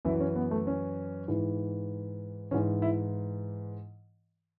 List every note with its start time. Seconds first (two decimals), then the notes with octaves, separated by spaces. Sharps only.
0.05 F#2 E3 E4
0.20 C#4
0.36 B3
0.51 A3
0.67 C#4
1.28 G#2 E3
2.51 G#2 E3 C#4
2.82 E4